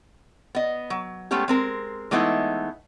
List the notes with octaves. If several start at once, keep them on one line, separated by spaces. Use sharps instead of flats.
B3 D#5
F#3
G#3 A3 B3 C#4 G4
G#3 C4 A#4
E3 G#3 A3 B3 D#4 E4